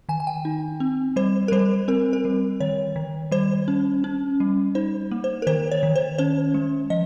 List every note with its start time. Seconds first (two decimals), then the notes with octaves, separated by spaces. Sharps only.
0.09 D#3 G#5
0.20 G#5
0.27 G5
0.45 D#4
0.80 C4
1.16 G3 C5
1.48 A#4
1.52 G3 C5
1.88 C4 A#4
2.13 A#4
2.25 G3
2.60 D#3 C#5
2.96 D#3
3.31 G3 C5
3.68 C#4
4.04 C#4
4.40 G3
4.75 D#4 C5
5.11 A#3
5.24 C5
5.42 A#4
5.47 D#3 C5
5.71 C#5
5.83 D#3
5.96 C5
6.18 C#4 C5
6.54 G#3
6.90 F3 D#5